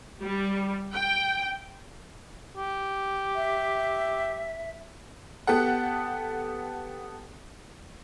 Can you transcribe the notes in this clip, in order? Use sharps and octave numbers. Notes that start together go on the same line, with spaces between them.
G3
G5
G4
E5
B3 G4 A4 F#5